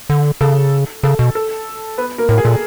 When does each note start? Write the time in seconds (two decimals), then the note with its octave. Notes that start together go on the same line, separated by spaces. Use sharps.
0.10 D3
0.41 C#3 A4
1.03 C#3 A4
1.19 B2
1.35 A4
1.98 B3 B4
2.18 A#3 A#4
2.28 A2 A#3 A#4
2.38 G#4
2.45 A#2 A4